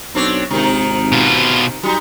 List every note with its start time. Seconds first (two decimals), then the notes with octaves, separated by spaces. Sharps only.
0.15 B1 C4 D4 C#5
0.51 G#1 C3 D#3 D#4
1.12 B2 F4
1.83 F#3 G3 D#4